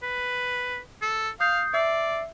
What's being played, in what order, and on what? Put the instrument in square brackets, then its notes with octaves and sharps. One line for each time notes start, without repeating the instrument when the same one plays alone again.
[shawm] B4
A4
[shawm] F5 [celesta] D#6 G6 C7
[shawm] D5 [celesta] E5 E6 C7